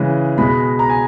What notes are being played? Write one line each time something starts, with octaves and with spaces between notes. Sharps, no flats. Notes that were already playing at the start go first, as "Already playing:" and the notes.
Already playing: C#3 E3 G#3
B2 G#3 B5
A#5
G#5